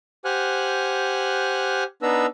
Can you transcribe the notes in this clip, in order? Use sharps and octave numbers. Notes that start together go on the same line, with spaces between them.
G4 C5 F#5 G#5 F6 F#6
B3 D4 D#4 B4 A#5 E6